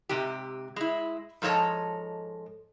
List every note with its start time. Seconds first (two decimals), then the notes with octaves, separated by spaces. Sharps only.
0.09 G#2 C3 G4
0.76 G#3 E4
1.42 G#2 F3 A4 C#5 D#5 A5